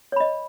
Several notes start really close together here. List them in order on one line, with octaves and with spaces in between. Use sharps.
C#5 B5 D#5